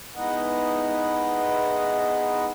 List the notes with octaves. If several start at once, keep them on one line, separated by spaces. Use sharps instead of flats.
G#3 B3 D#4 E4 D#5 F#5